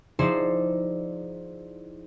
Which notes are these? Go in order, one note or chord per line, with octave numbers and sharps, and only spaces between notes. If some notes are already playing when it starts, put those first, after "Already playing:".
F3 D#4 E4 G#4 C5 D5